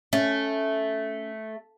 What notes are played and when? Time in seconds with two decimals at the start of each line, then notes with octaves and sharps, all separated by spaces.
0.13 A3 C#4